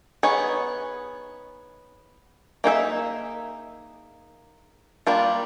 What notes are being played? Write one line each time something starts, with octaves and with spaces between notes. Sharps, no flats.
B3 D#4 G#4 C#5
A#3 D#4 G#4 C5 E5
G3 A#3 D4 F4